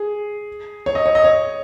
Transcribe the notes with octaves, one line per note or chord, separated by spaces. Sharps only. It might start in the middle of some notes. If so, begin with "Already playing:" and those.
Already playing: G#4
C#5
D#5
C#5
D#5
C#5